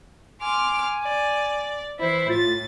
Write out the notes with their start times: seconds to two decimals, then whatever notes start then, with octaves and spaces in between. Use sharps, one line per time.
0.41 G#5 C6 D6 F6
1.04 D5
2.00 E3 E4 C5
2.29 A2 F4 A6